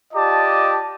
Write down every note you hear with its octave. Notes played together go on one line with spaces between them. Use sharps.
F4 G4 D5 D#5 A5